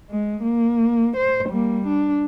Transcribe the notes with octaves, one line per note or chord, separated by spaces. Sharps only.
G#3
A#3
C5
G3 A#3
D4